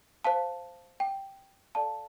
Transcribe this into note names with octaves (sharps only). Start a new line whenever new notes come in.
C5 F5 A5
G5
A4 D5 F5 A5